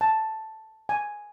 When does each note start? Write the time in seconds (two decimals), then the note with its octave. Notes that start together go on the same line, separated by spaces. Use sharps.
0.01 A5
0.89 G#5